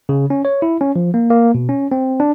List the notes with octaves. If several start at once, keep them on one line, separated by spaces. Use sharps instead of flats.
C#3
C#4
C#5
E4
C#4
F3
A#3
A#3
B2
C#4
C4
D4